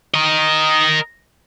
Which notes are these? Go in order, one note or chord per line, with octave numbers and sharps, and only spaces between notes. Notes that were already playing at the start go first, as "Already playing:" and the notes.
A#4 D#5